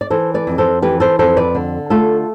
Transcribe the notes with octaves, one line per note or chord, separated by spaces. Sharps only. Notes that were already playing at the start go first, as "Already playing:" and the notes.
D5
E3 A4 C5
B4 D5
F2
A4 C5
E3 G4 B4
A4 C5
F2 A4 C5
B4 D5
D3
A3 F4 A4